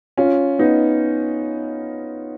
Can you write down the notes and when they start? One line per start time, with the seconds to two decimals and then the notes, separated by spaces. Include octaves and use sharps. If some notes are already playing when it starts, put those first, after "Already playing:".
0.17 C#4 F4
0.59 B3 D#4